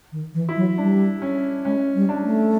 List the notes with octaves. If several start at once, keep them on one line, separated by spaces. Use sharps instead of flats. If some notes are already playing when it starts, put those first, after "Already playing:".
D#3
E3
E4
F#3
G3 D4
C#4
G#3 C#4
G3
D4
A3